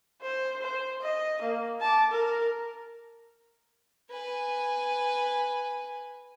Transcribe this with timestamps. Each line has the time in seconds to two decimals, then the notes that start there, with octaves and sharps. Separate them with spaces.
0.22 C5
0.62 C5
1.02 D#5
1.42 A#3
1.81 A5 D6
2.11 A#4
4.10 B4 G#5